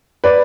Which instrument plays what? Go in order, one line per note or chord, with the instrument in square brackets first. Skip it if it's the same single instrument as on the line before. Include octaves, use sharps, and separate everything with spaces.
[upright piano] B4 D5